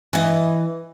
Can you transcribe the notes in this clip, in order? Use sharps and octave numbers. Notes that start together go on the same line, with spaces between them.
E3 D#5